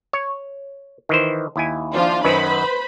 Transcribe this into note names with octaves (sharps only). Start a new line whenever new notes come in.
C#5
D#3 E3 C5
D#2 E4 G#5
F3 D4 F4
F#2 D#3 F#3 B4 C5 B5